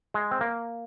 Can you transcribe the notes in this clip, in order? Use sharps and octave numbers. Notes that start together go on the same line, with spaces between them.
G#3
C4
A#3